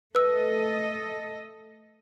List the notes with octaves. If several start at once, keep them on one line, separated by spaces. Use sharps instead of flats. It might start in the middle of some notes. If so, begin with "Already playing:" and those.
A3 A4 B4 D#5 E6